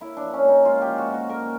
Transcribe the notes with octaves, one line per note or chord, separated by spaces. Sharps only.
A#3 E4
D4
F3
C#4
A#2 D#4
G#3 F4
F3 G4
F#4
A#2
F#4
A#3 A#4